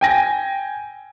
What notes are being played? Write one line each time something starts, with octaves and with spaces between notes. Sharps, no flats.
G5 G#5 A#6